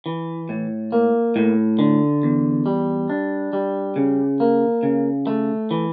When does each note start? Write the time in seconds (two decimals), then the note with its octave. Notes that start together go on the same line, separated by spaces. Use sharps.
0.06 E3
0.49 A2
0.92 A#3
1.36 A2
1.79 D3
2.23 E2
2.66 G3
3.10 D4
3.53 G3
3.96 C#3
4.40 A#3
4.83 C#3
5.27 A3
5.71 E3